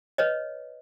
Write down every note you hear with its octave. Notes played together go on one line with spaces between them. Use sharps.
B4 C#5 D#5